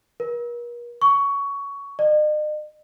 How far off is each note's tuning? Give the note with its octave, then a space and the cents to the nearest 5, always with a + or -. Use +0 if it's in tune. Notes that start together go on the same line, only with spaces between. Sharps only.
A#4 +45
C#6 +15
D#5 -45